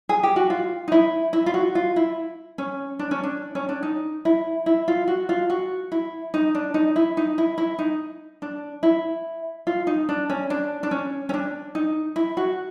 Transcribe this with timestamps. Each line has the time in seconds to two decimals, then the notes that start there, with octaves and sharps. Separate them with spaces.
0.09 G#4
0.23 G4
0.36 F#4
0.50 F4
0.88 D#4
0.92 E4
1.33 E4
1.46 F4
1.54 F#4
1.75 F4
1.96 E4
2.58 C#4
2.99 D4
3.11 C#4
3.23 D4
3.55 C#4
3.69 D4
3.83 D#4
4.25 E4
4.66 E4
4.88 F4
5.08 F#4
5.29 F4
5.50 F#4
5.92 E4
6.34 D#4
6.55 D4
6.74 D#4
6.96 E4
7.17 D#4
7.38 E4
7.58 E4
7.79 D#4
8.42 D4
8.83 E4
9.67 F4
9.87 D#4
10.09 D4
10.30 C#4
10.50 D4
10.83 D4
10.91 C#4
11.29 C#4
11.34 D4
11.75 D#4
12.16 E4
12.37 F#4